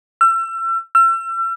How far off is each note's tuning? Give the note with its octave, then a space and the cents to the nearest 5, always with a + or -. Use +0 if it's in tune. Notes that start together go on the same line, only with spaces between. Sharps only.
E6 +35
E6 +40